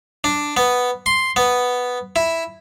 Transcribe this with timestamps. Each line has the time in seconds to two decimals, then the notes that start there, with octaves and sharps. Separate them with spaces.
0.24 D4
0.57 B3
1.06 C6
1.36 B3
2.16 E4